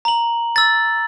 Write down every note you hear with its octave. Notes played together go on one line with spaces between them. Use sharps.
A#5 F#7
E6 A6